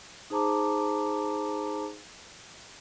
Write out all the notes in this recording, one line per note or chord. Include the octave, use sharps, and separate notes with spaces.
D#4 G#4 C5 A5 A#5 D6